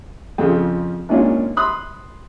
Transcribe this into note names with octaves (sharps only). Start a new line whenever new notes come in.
F2 C#3 F3
G#1 A#2 C#4 D4 F4
B5 C6 D#6 F#6